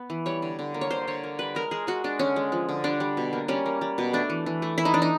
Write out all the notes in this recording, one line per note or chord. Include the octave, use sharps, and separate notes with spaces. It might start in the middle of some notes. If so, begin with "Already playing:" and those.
Already playing: B3
E3
G3 C#5
D3
D3
A#3
C#5
D3 C5
D3 C#5
A#3
G3 B4
G#3 A#4
G#3 G#4
G#3 F#4
G#3 D4
D3 C#4
G#3
F3
D3
G3 D4
G3
B2
A#3
G3 C#4
A#3
G3
B2
A3 D4
E3
E3
A3
E3 E4
D#4
E3 D4
D#4